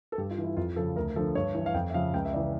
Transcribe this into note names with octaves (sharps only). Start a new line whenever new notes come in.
A4
G2 G4
F4
E3
E4
F2 F4
C#3 F3 A4
D2 A#4
D3 F3 A4
G2 C#5
E3
F5
F2 G5
E5
C#3 F3 F5
C#2 G5
E5
C#3 E3 D5